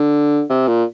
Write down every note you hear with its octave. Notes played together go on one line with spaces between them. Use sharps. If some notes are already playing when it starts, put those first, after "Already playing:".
Already playing: D3
C3
A#2